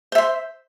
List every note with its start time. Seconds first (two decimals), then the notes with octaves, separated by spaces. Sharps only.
0.12 C5
0.15 E5
0.18 C6